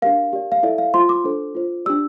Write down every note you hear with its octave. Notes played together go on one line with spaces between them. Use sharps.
D4 G4 A#4 F5
G4 A#4 D5
F5
E4 A4 D5 E5
F5
F4 C5 C6
D6
D4 A4 C5
F4 C5
D4 G4 D5 E6